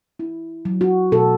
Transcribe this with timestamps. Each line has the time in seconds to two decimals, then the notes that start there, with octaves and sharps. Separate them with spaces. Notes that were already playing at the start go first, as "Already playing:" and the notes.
0.19 E4
0.65 F#3
0.81 F#4
1.12 B2 A4